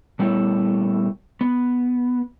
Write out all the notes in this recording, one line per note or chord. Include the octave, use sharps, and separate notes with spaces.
A#2 G3 A3 B3 E4 C#5
B3